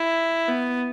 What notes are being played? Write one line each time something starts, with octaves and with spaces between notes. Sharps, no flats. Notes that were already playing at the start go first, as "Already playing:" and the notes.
Already playing: E4
B3